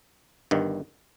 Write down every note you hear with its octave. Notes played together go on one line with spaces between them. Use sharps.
G1 G2 D#3